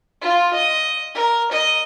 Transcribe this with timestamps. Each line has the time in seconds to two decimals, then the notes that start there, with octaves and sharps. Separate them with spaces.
0.22 F4
0.54 D#5
1.14 A#4
1.51 D#5